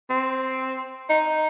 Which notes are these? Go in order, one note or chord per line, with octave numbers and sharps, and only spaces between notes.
C4
D#4